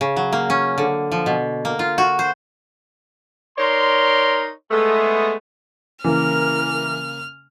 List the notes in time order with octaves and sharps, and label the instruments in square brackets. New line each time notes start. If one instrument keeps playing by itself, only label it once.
[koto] C#3
F#3
A#3
C#4
D3
F3
B2
A#3
F4
F#4
C5
[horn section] D#4 A#4 C#5 D5 C6
G#3 A3 B3
[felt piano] C#3 A#3 [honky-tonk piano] E3 [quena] A#4 [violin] F6